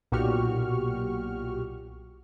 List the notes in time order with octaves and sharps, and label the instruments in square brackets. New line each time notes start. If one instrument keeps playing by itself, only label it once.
[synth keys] B1 A#2 F#4 G4 C#6 F6